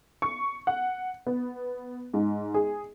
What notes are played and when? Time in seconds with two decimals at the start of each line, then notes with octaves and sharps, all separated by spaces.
0.22 C#6
0.67 F#5
1.27 B3
2.14 G#2
2.54 G#4